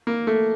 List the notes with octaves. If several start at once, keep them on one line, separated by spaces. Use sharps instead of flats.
A#3
A3